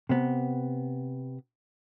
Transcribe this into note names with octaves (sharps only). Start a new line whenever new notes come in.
C3 B3